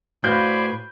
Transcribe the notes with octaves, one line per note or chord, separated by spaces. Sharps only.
A2 F#4 B4 C5 D5 F5 G#5 G6